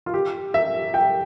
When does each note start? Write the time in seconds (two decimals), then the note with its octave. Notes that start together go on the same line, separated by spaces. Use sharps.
0.06 F4
0.14 G4
0.54 E5
0.94 G5